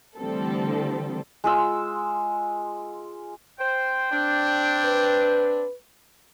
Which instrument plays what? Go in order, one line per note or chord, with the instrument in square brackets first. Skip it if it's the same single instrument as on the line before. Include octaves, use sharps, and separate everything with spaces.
[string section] D3 E3 G3 A3 C4 A4
[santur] G#3 F4 E6
[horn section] C5 [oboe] G5
[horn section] C4 D4
[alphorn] B4